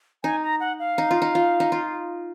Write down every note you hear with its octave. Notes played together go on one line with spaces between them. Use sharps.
D#4 G#5
A#5
F#5
F5
D#4
F4
D#4
F4
D#4
F4